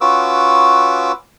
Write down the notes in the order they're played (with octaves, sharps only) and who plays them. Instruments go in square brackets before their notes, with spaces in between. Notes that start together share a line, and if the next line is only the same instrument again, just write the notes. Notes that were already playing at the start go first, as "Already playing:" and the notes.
[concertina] C#4 F4 F#4 B4 D6 E6